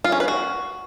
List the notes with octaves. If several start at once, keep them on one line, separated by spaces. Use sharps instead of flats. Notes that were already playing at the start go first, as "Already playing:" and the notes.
F4
C#4
B4
F#4